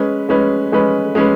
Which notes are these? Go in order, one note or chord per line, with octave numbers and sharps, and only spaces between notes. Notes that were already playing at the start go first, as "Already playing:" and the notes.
Already playing: G#3 C#4 B4
G#3 C#4 B4
G#3 C#4 B4
G#3 C#4 B4